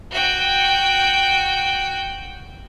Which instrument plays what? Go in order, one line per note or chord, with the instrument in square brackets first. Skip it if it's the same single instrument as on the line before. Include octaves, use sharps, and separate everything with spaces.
[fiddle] F#4 G5